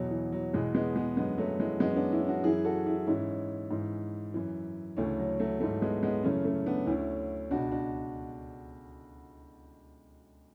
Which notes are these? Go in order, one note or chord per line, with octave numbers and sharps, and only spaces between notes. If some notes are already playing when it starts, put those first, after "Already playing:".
Already playing: E2 B2 F#3
E3
F#3
E2 B2 E3 G#3
G#3 B3
G#3 B3
F#2 D3 G#3 B3
F#3 A3
E3 G#3
F#2 E3 G#3 B3
C#4
B3 D4
C#4 E4
D4 F#4
F#2 E3 E4 G#4
F#4 A4
E4 G#4
G#2 E3 C#4 E4
G#2 E3
F#2 E3
D2 C#3 E3 A3 C#4
F#3
F#3 A3
G#2 E3 F#3 A3
G#3 B3
G#3 B3
F#2 C#3 E3 A3 C#4
A3 C#4
B3 D4
D2 D3 C#4 E4
C#2 B2 D4 F#4
D4 F#4